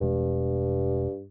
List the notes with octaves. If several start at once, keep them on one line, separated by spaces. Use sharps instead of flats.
E1 G2 B2 G#3